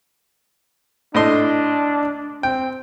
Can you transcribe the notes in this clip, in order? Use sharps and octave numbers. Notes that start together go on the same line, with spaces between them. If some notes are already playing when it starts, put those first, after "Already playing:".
A2 D4 D#5 C6
C4 G5